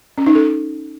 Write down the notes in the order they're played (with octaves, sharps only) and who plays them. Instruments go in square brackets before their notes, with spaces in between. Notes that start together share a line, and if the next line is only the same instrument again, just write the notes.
[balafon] C#4
D#4
A4